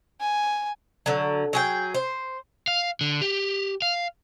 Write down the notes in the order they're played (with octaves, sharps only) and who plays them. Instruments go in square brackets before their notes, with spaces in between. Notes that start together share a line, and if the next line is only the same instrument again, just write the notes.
[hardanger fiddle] G#5
[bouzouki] D3 F#3
F#3 G#4 G5
C5
[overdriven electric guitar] F5
D3
G4
F5